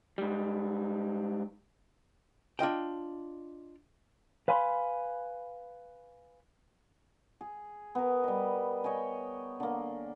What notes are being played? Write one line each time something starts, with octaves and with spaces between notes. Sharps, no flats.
G#2 G3
D4 F4 D#5 G5
B4 F5 G#5 B5 C6
G#4
B3 A#4
G3 D#5
C#5 D#5 G5 G#5
D3 A#3